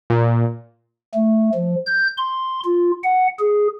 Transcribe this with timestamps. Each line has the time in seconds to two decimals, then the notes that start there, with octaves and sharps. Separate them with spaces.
0.10 A#2
1.15 A3
1.55 F3
1.86 G6
2.17 C6
2.65 F4
3.04 F#5
3.39 G#4